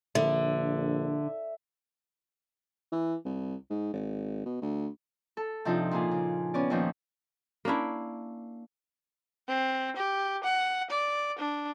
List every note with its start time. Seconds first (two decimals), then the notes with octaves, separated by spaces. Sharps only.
0.15 A#1 D3 E5
2.92 E3
3.25 C2
3.70 G#2
3.93 G#1
4.45 B2
4.62 D2
5.37 A4
5.65 C3 F3 D4 D#4 F4
5.91 A#2 A#3 F4 G#4
6.11 C#3
6.54 B3 C#4 D5
6.70 D#2 A#2 F3 C#4 D#4
7.65 A#3 C#4 D4 E4
9.48 C4
9.96 G4
10.43 F#5
10.90 D5
11.39 D4